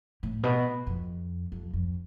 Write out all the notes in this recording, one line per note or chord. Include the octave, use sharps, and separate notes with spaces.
A2
B2
F2
F2
F2